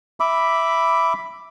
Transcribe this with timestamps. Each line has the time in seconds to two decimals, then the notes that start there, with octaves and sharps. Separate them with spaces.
0.20 E5 B5 D6